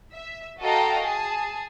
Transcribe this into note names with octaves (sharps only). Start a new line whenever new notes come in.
E5
F#4 A4 D#5 F5 G5 A#5
G#4 A5